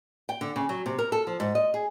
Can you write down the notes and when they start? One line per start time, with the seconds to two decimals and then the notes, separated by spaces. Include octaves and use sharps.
0.29 G5
0.41 D3
0.56 C#3
0.69 F#3
0.86 C3
0.98 A#4
1.12 A4
1.27 F3
1.40 G#2
1.55 D#5
1.74 G#4